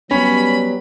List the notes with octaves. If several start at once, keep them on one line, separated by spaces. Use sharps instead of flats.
F#3 G3 B3 C#4 B5